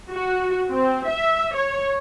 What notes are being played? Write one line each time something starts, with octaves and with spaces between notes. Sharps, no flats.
F#4
C4
E5
C#5